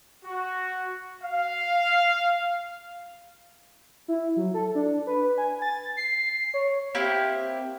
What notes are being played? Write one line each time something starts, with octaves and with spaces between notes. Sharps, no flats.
F#4
F5
E4
F#3
A4
D4
B4
G#5
A6
C7
C#5
A#3 C4 E4 G4